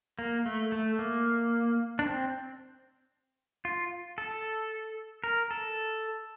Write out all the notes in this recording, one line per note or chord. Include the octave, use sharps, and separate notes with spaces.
A#3
A3
A3
A#3
D4
C4
F4
A4
A#4
A4